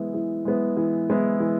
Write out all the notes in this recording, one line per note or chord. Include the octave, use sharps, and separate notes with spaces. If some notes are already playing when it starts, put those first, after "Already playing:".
Already playing: E3 G#3 B3 E4
E3
G#3 B3 E4
E3
G#3 B3 E4
E3